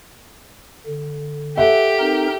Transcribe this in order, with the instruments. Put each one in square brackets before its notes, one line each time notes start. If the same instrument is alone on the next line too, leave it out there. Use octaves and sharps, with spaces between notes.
[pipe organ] D3
[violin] G4 [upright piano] A4 E5 F#5
[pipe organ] C4 D#4 A#4